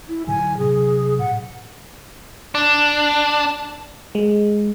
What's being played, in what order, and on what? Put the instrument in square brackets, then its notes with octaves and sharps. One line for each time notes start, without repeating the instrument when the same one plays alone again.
[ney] E4
[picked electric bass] A2 D3 F#3 [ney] G#5
[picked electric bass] C3 F#3 C#4 [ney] G#4
[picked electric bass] A2 [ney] F#5
[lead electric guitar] D4
[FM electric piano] G#3